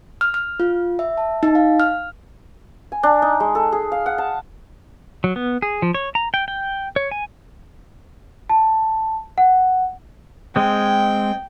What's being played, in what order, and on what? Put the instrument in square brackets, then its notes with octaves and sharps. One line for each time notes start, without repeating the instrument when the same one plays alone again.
[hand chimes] F6
F6
F4
E5
A5
D#4
F5
F6
[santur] G#5
D4
D#4
G#3
A4
G#4
F5
F#5
A5
[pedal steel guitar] F#3
B3
G#4
F3
C#5
A#5
G5
G5
C#5
G#5
[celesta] A5
F#5
[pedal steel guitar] G#3 C4 [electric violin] G5